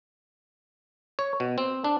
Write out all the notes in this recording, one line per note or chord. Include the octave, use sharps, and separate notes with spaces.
C#5
B2
C4
D4